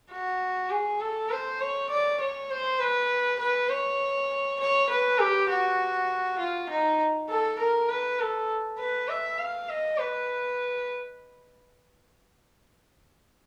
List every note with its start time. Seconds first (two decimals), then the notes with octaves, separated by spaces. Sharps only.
0.11 F#4
0.70 G#4
1.00 A4
1.31 C5
1.61 C#5
1.90 D5
2.21 C#5
2.51 C5
2.80 B4
3.39 B4
3.70 C#5
4.60 C#5
4.90 B4
5.19 G4
5.49 F#4
6.39 F4
6.70 D#4
7.29 A4
7.59 A#4
7.89 B4
8.20 A4
8.79 B4
9.09 E5
9.39 F5
9.69 D#5
9.99 B4